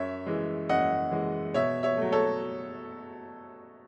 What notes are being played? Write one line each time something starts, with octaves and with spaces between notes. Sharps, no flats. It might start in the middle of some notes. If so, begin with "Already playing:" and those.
Already playing: F#2 C#5 E5
E3 G#3
F#2 D#5 F#5
E3 G#3
B2 C#5 E5
C#5 E5
F#3 A3
A4 C#5